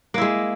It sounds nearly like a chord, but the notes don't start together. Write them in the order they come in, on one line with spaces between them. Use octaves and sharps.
A#3 E4 G#3